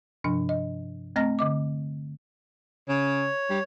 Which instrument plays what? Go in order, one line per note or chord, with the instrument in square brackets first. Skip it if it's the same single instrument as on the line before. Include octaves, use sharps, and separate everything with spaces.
[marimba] G2 C3 F3 D4
D#5
A3 C4 D#5 A#5 F6 A#6
D3 D#5 D6
[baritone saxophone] C#3 [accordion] C#5
[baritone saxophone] G3